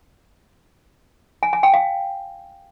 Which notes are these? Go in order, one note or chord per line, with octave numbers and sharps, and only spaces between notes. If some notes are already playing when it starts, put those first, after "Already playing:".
G#5
G#5
G5
F5